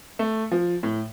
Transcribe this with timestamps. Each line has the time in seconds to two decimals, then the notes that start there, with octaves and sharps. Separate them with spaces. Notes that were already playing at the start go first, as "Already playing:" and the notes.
0.19 A3
0.52 F3
0.83 A2